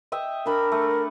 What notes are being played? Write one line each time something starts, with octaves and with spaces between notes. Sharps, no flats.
D#5 E5 G5
D4 A#4 B5
A3